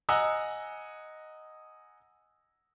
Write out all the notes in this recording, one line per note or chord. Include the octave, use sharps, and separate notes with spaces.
D#5 F#5 G#5 A#5 E6